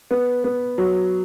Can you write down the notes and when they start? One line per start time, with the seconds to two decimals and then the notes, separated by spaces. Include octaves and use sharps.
0.11 B3
0.44 B3
0.78 F#3